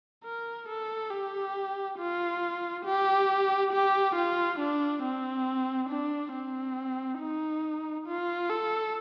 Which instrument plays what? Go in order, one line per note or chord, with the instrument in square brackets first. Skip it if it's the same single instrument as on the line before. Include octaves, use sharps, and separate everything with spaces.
[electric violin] A#4
A4
G4
F4
G4
G4
F4
D4
C4
D4
C4
D#4
F4
A4